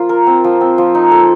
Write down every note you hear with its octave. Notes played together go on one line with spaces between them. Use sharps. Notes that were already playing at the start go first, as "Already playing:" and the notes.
Already playing: F3 A#3 F4
A#4
C4
F3
C4
F3
D#4
A4